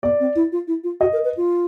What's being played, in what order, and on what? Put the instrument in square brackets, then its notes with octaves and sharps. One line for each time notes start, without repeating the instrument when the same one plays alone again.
[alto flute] B3 [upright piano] D5
[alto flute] C4
E4
F4
E4
F4
[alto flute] F#4 [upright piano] D#5
[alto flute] A#4
B4
F4